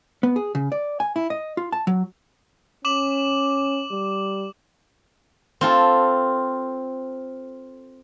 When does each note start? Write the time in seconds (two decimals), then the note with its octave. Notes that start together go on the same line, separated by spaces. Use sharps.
0.23 B3
0.36 G#4
0.55 C#3
0.72 D5
1.00 G#5
1.16 E4
1.30 D#5
1.57 F4
1.73 A5
1.87 F#3
2.85 C#4 D6 E7 F#7
3.92 G3
5.61 C4 F4 A4